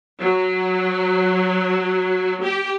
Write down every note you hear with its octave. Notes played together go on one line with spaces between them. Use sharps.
F#3
G4